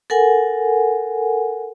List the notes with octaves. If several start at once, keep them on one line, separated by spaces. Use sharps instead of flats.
A4 A#4 F#5 G#5